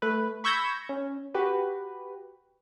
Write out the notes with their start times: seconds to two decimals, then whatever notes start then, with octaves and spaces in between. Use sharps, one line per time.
0.02 A3 B4
0.44 B5 C#6 E6 G6 G#6 A#6
0.89 C#4
1.34 F#4 G4 B4